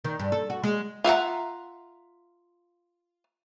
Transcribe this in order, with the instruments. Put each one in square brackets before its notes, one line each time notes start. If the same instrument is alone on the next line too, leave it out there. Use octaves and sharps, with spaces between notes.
[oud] D#3
G2
A4
F#4
G#3
[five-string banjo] F4 E5 F#5 A#5